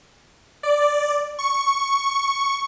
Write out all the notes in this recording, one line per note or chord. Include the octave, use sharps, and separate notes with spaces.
D5
C#6